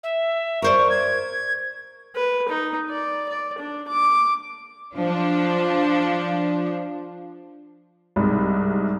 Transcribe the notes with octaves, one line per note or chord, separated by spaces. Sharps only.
E5
A#4 C5 D5 C#6
G#6
B4
D#4
D5
D5
D4
D6
F3 D4
C2 G#2